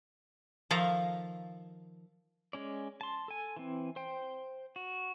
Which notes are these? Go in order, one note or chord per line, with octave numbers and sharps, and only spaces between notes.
D#3 F3 A4 E5 F5 A#5
G#3 C#4 D5
A5 C6
A4 G#5
E3 C4
C5 G5
F#4